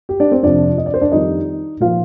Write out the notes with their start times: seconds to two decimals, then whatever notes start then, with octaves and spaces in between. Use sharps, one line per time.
0.09 G4
0.20 D4 D5
0.32 C4 C5
0.43 F2 C3 F3 D4 D5
0.78 D#5
0.86 D5
0.94 C5
1.01 D4 D5
1.12 F2 D#3 G3 D#4 D#5
1.80 A#2 F3 F4 F5